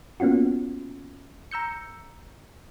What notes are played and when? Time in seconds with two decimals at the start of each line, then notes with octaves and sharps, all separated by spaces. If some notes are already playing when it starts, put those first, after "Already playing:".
0.20 A#3 B3 C#4 F4 F#4
1.51 A#5 E6 G6 C#7